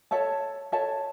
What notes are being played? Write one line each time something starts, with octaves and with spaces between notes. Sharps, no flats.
A4 C#5 E5 A5
A4 C#5 E5 A5